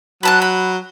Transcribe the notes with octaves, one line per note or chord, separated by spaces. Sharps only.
F#3 B4 A5 F#6
B5